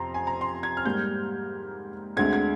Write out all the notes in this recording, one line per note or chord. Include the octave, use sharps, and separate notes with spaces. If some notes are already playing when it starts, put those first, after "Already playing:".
Already playing: F2 C3 F3 A#5 C6
G#5
A#5
C6
G#6
F6
G#2 G3 A#3 G6
D2 D3 G#3 C4 G#6
G#6